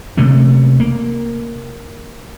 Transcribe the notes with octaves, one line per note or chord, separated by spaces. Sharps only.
C3 A3 A#3 C#4
A#3